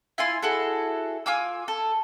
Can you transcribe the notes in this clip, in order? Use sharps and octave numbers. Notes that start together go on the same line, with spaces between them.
E4 F4 G#5 C6
E4 F#4 G#4 A4
F4 G#5 D6 E6
A4